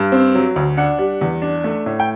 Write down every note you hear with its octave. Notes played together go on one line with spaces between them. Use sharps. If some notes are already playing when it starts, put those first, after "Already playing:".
Already playing: G2
C4
F#3
D2
D4 F#5
G3
E2
D4
A3
A2
G5